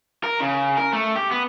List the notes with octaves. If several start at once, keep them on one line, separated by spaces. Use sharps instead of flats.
A#4
C#3
A#4
A3
G4
B3